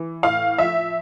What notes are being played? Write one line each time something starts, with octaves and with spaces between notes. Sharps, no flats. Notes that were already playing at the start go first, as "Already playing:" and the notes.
Already playing: E3
A2 F5
F3 E5